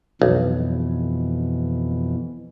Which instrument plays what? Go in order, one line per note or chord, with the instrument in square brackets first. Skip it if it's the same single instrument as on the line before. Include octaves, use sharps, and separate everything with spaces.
[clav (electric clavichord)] B1 [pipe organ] F2 B2 E3